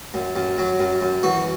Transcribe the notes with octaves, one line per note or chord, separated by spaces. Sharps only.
F#2
F#2
F#3
F#2
F#2
E3 F#4